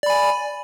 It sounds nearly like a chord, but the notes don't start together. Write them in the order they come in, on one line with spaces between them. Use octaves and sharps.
D5 B5 G#5